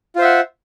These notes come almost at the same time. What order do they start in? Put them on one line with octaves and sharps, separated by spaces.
F4 C5 E5 F#5